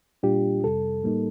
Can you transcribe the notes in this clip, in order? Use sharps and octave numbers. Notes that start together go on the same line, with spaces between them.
A#2 G3 D4 F4 G4
F2 C3 G3 A4
A2 G3 A#3 D#4